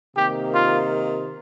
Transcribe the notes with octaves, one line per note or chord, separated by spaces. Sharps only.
C3 D#3 A#3 G4
F4